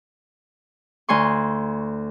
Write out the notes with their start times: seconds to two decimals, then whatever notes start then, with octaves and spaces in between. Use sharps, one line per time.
1.09 D2 G#5 C6 C#6